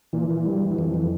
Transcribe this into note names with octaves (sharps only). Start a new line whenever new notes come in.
A#2 E3
A#2 E3
G2 G3
E3
F#2
F2 E3
E3